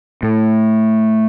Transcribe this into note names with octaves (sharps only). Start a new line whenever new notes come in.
A2